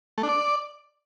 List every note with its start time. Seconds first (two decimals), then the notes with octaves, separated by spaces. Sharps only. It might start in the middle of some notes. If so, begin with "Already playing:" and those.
0.18 A3
0.23 D4
0.29 D5